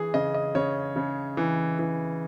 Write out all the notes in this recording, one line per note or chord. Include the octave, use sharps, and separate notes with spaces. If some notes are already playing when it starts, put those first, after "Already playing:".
Already playing: E3 G#4
C#3 D#5
D#5
C#3 C#5
C#3
E3
E3